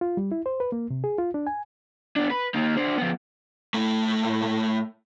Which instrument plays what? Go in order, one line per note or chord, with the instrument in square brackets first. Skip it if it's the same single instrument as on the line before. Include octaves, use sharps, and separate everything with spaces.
[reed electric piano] F4
G3
E4
C5
B4
A#3
C3
G#4
F4
D4
G#5
[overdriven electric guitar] B3 D4
B4
A#3 D#4
D4 C5
F3 B3
[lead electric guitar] A2 A3